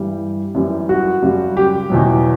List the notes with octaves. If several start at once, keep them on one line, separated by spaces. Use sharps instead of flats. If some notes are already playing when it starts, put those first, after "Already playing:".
Already playing: G2 E3 G3
F#2 E3 G3
F#4
F#2 C#3 G3
G4
E2 B2 F#3